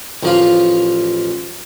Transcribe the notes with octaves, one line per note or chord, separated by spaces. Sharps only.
A1 F3 F4